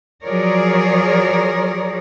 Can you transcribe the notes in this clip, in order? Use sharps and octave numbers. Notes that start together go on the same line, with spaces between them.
F3 F#3 G#4 A#4 C#5 D5